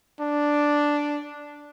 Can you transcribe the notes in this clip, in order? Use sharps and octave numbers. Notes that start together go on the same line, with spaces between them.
D4